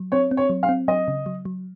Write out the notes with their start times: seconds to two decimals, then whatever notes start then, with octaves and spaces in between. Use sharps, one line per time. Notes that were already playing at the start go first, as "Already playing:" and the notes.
Already playing: F#3
0.12 C4 C#5
0.31 C4
0.37 C#5
0.50 F#3
0.63 F5
0.69 C4
0.88 F#3 D#5
1.08 C#3
1.26 F#3
1.45 F#3